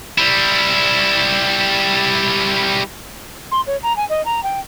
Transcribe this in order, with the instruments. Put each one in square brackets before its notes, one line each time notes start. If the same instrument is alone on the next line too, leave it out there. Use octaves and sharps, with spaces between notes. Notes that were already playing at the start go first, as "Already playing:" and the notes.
[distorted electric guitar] G3 E4
[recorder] C6
C#5
A#5
G#5
D#5
A#5
G5